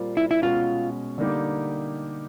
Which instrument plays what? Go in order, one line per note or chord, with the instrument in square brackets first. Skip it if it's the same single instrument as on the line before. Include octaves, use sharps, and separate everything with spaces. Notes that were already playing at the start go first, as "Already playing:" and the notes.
Already playing: [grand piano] A#2 G3 C4 F4 A#4
[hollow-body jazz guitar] E4
E4
[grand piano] B2 G#3 C#4 [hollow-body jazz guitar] F4
[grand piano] D3 G3 A#3 D#4 G4